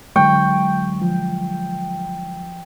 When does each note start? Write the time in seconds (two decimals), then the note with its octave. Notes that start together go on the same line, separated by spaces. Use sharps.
0.16 D3 F#3 G#3 G5 C#6
1.02 F3